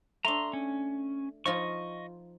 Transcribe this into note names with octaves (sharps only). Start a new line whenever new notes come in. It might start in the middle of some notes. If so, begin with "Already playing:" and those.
A3 D4 A#5 C6
C#4
F3 D#4 F4 D#5 C#6